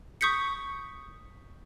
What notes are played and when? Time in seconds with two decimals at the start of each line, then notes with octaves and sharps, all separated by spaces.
0.21 C#6 D#6 G6 B6 C#7